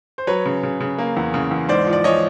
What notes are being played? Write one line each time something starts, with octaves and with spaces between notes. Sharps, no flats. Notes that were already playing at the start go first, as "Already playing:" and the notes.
C5
F#3 B4 C#5
C#3
C#3
C#3
A#3
E2
C#3
E2
G#2 C5 D5
F3
D5
F3 C#5 D#5